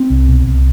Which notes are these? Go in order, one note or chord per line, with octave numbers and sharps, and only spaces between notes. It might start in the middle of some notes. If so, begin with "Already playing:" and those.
Already playing: C4
C2
B2
C2